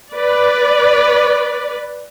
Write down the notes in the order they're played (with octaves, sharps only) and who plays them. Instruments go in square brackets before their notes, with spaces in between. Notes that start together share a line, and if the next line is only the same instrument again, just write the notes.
[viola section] B4 D5